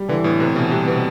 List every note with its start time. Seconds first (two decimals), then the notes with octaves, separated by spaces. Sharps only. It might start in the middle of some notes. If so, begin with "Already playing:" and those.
Already playing: G3
0.09 D3 E3
0.24 A2 B3
0.40 C3 B3
0.55 B2 E3
0.71 C3 G3
0.87 B2 B3